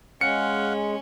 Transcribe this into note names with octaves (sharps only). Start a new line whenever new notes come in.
G#3 C#4 F5 F#5 C#7